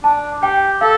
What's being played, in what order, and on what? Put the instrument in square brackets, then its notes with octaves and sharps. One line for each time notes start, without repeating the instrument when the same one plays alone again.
[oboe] D4 [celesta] A5
[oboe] G4 [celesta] G5
[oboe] A4 [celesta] F5